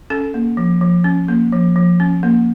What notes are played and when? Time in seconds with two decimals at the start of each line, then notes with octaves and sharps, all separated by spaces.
0.10 C#4 A4
0.34 A#3
0.57 F3
0.81 F3
1.04 C#4
1.28 A#3
1.52 F3
1.76 F3
2.00 C#4
2.23 A#3